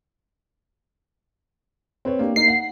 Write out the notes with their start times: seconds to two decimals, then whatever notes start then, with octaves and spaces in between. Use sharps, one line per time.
2.05 C4 B4 C#5
2.19 A#3 D4 G4
2.36 A#3 D#4 C7
2.48 F#5